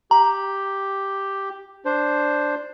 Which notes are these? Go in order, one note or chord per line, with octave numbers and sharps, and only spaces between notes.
G4 A#5
D4 C5